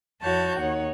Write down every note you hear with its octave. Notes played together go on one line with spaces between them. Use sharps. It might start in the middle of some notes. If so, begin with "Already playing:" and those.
F2 E4 F#4 C#5 A5 G6
D#2 D#4 C#5 F#5